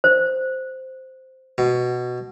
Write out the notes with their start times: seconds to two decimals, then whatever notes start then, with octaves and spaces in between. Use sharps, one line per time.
0.04 C5
1.58 B2